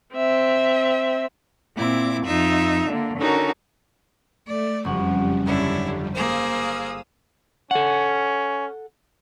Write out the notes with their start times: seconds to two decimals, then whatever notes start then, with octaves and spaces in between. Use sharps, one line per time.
0.15 C4 E5
1.75 A#2 C4 E4 D6
2.26 F2 D#4 F4 E5
2.89 D3 A#3
3.19 D3 C#4 D#4 F#4 A#4
4.46 A3 D5
4.85 F#1 F2 F3 G3 F#4 F#5
5.46 G1 D3 C#4 E4
6.15 A#3 G#4 C5 F5 D#6 E6
7.71 C#4 A4 F#5